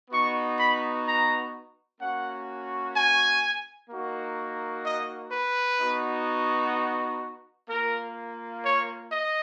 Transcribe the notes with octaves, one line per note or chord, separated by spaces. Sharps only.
B3 D#4 F#4 C#6
B5
A#5
A#3 C#4 F#4 F#5
G#5
A#3 D#4 F#4
D#5
B4
B3 D#4 F#4
A#3 F4 A#4
C#5
D#5